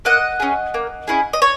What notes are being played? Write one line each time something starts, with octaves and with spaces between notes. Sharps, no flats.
A#3 D#5 F#5
C#4 E4 G#4
A#3
C#4 E4 G#4
D#5
C#5